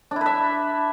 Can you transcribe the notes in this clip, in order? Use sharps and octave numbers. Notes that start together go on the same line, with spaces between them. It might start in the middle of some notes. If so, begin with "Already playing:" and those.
D4 E4 B4 E5